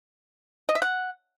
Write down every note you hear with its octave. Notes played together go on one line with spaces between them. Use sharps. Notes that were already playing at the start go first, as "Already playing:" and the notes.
D#5
E5
F#5